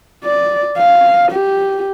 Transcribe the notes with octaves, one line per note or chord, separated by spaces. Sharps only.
D5
F5
G4